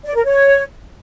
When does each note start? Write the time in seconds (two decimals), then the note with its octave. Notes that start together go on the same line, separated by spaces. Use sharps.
0.05 D5
0.15 A#4
0.25 C#5